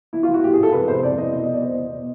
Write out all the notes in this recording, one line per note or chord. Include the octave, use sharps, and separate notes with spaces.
E3 E4
F4
E3
F#4
A2 G4
G#4
A2 A4
F2 B4
C3 C5
F2 D5
E3 D#5
B2 D#5
D#5
B2
D5
E2 C5
E2 D#5
B2